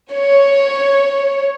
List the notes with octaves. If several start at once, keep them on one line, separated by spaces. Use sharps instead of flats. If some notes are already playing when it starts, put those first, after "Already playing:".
C#5